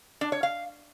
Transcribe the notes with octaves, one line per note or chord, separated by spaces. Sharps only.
D4
C#5
F5